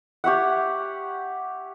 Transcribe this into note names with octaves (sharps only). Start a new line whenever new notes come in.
G4 C#5 E5 F#5